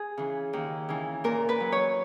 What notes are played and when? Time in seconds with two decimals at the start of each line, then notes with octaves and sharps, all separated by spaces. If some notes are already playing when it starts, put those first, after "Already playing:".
Already playing: G#4
0.17 C#3 E3
0.53 D#2
0.89 C#3 E3
1.24 A#2 A#4
1.49 B4
1.60 F#3
1.72 C#5